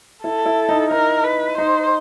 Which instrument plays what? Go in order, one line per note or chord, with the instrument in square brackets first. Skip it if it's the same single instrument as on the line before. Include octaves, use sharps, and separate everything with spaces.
[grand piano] E4 [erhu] A4
[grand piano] E4
D#4
[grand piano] D#4 [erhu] A#4
[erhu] B4
[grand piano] D#4 [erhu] C5